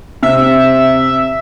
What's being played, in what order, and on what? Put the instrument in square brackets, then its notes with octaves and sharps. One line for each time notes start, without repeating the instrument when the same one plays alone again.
[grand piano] C3 [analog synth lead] E5